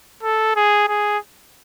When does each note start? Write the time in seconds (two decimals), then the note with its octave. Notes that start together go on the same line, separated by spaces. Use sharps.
0.23 A4
0.56 G#4
0.88 G#4